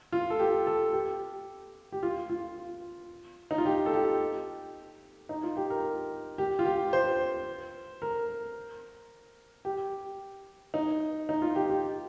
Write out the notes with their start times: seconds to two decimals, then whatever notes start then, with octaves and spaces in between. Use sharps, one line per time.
0.12 F4
0.30 A4
0.39 G4
0.67 A4
0.93 G4
1.92 G4
2.03 F4
2.30 F4
3.51 D#4
3.58 F4
3.66 G4
3.86 A4
3.93 G4
5.29 D#4
5.43 F4
5.57 G4
5.70 A#4
6.38 G4
6.59 F4
6.66 G4
6.93 C5
8.02 A#4
9.65 G4
10.74 D#4
11.29 D#4
11.42 F4
11.56 G4
11.70 G4